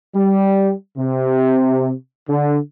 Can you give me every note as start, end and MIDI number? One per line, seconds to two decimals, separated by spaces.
0.15 0.72 55
0.98 1.92 48
2.28 2.58 50